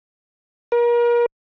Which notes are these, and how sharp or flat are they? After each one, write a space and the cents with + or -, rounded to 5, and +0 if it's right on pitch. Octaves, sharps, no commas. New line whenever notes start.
A#4 +35